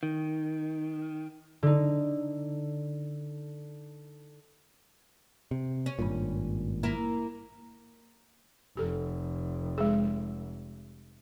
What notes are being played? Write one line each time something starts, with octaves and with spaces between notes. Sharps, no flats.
D#3
D3 D#4
C3
C#4
G#1 G2 A#2
A#3 E4 A#4
F1 G4 A4
G#3 G#4